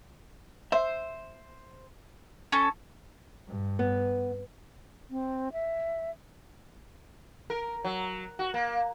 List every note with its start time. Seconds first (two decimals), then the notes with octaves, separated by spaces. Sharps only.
0.72 C5 E5
2.52 C#4 A4
3.48 G2
3.79 B3
5.10 C4
5.53 E5
7.50 A#4
7.85 F#3
8.39 F#4
8.54 A#3